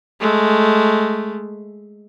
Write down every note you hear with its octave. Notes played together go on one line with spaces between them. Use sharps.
G#3 A3